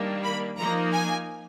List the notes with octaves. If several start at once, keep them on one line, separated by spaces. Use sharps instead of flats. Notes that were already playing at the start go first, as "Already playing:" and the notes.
Already playing: D#3 G3 A#3 D4
B5
F3 A#3 D#4 A#5
G#5